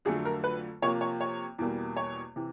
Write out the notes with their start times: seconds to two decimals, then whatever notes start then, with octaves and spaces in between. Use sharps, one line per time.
0.05 F2 D3 F#3 A3 G#4
0.25 A#4
0.44 B4
0.82 C3 F3 A#3 C#5
1.01 C#5
1.21 C#5
1.58 E2 B2 G3 A#3
1.97 C#5
2.36 C3 E3